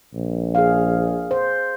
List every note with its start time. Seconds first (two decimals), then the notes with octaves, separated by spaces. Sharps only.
0.14 A#1
0.55 G#4 F5
1.31 C5